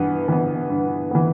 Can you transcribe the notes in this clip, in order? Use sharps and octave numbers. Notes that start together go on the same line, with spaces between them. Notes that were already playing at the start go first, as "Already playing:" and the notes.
Already playing: G2 E3 B3
E3 B3
G2
E3 B3